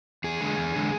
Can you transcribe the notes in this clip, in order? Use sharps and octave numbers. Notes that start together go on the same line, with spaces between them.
E2 G#4
D3 G#3
E2
D3 G#3